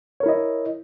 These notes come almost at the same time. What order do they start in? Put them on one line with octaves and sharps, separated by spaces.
C#5 A#4 E4 D#5